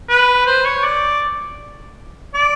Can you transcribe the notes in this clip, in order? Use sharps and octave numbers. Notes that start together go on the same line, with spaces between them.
B4
C5
C#5
D5
D5